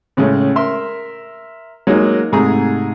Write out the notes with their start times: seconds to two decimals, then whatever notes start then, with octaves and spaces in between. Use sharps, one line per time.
0.17 A2 C#3 G#3 A3
0.56 A#4 E5 C6
1.87 F#3 G#3 A#3 D#4
2.32 G#2 C3 G#3 A3 G#4 A#5